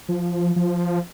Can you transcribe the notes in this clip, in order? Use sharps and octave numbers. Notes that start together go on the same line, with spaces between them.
F3
F3